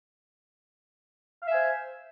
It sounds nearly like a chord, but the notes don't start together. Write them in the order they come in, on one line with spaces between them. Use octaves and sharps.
F5 E5 G#5 C5